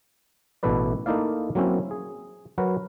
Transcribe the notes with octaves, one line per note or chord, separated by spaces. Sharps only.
A1 B2 A3 E4 B4 D5
A3 A#3 D#4 E4 D5 F5
F#3 A#3 C4 C#4 E4
G#4
F#3 F#4 A#4 B4